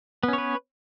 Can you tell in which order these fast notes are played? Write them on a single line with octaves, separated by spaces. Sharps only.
B3 C#4 C#5 B4